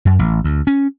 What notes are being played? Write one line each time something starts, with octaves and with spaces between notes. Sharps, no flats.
F#2
A1
D2
C#4